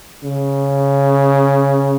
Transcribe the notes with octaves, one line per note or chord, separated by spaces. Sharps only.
C#3